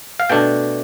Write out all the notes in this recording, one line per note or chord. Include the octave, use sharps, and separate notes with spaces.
F5
B2 A3 D4 G5